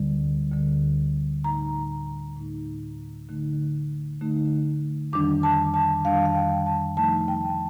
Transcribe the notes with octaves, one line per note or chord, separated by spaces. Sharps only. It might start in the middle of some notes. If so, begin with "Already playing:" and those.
Already playing: D2 D3 G3
D2 D3 G3
A2 A3 D#4 A#5
A2 A3 D#4
D3 A3 D#4
D3 A3 D#4
F2 D#3 G3 D4 D6
A5
A5
F2 D#3 G3 D4 F5
F5
G5
A5
C3 F3 A3 D#4 A5
G5